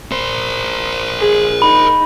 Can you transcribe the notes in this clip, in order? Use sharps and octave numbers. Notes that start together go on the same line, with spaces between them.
A#4 C5
G#4
D#4 B5